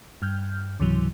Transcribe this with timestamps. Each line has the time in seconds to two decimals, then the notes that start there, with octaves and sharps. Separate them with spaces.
0.22 G2 F6 G6
0.80 C#2 G#2 C3 E3 F#3